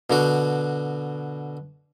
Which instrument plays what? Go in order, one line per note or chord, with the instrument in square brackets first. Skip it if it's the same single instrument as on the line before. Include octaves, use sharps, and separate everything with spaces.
[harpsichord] B2 D3 F#4